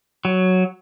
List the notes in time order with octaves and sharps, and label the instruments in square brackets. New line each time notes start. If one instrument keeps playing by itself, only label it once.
[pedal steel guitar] F#3